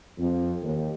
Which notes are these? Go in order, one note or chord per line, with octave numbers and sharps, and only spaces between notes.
F2
D#2